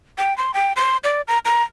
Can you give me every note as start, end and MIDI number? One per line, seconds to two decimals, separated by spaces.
0.18 0.36 79
0.38 0.52 84
0.54 0.73 79
0.76 0.97 84
1.04 1.21 74
1.28 1.38 82
1.45 1.63 82